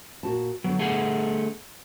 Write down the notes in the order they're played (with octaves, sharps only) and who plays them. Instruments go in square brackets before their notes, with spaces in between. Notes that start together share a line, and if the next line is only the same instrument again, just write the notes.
[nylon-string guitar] A#2 F#4 A5
[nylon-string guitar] D3 B3 [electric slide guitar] F#3
[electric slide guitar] A3 G#4 F#5